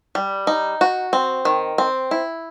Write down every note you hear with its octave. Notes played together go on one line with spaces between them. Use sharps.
G3
D#4
F#4
C4
D#3
C4
E4